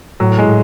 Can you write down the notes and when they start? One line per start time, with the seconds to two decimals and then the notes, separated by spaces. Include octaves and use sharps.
0.20 A2 F#3
0.38 G#3
0.47 A2